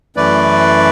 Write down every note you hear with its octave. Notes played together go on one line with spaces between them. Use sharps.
F#2 E3 A3 B4 D5